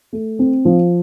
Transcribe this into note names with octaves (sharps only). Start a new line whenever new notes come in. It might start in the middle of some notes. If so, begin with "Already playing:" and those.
A3
C4
F3